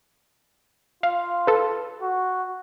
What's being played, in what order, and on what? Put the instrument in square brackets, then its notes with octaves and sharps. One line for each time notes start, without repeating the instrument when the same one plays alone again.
[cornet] F4 [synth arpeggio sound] F5
[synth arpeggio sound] A4 B4
[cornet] F#4